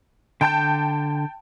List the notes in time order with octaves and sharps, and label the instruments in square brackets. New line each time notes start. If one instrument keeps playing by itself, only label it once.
[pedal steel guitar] D3 G6 [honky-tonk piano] G5 A5